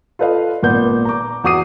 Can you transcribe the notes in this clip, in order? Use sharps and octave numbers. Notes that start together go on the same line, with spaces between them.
F4 A4 B4 D#5 F5
G#1 A#2 B3 G6
A#5 D6
E2 F#4 D6 D#6 C7 D#7